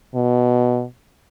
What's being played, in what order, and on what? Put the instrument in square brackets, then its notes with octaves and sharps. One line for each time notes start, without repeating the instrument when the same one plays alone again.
[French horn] B2